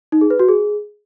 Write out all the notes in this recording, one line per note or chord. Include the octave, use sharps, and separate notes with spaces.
D#4
G#4
B4
F#4
G#4